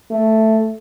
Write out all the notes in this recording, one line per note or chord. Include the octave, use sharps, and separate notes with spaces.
A3